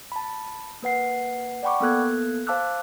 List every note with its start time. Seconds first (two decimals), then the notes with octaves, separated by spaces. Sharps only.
0.12 A5 B5
0.83 A#3 B4 F#5 C7
1.63 D5 F#5 G5 B5 C#6 D6
1.81 A#3 B3 A4 F#6 G#6
2.47 C5 F5 A5 D6 E6 F#6